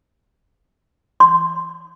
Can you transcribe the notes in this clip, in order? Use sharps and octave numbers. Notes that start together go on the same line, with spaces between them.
C6